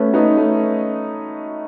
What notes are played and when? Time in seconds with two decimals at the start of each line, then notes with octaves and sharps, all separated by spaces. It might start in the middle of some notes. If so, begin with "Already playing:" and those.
Already playing: A3 B3 C#4
0.14 B3 D#4
0.37 A3 C#4